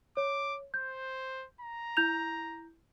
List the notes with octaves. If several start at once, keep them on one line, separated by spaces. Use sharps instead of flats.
C#5 D6
C5 G6
A#5
E4 G6 F7